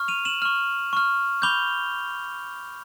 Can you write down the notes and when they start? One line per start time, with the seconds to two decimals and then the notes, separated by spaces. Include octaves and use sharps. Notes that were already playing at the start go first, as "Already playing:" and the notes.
Already playing: C#6 F6
0.08 D#7 F7
0.25 E7 F#7
0.42 C#6 F6
0.93 C#6 F6
1.42 B5 D6 G6 F7 G7